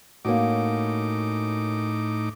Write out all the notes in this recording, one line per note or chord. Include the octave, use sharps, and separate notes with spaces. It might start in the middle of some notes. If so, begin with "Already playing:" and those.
A2 A#3 C#4 D#4 F#4 D6